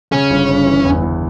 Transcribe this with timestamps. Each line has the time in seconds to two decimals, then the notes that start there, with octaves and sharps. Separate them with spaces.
0.12 C#3 C#4
0.30 G1
0.48 G1
0.66 E3
0.85 E2
1.02 E2